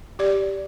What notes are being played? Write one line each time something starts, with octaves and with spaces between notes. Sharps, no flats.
G4 D5